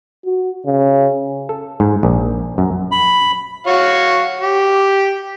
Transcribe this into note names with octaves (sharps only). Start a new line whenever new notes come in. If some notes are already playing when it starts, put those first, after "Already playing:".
F#4
C#3
A4
G#2
A#1
F#2
B5
F#4 C#5 F5
G4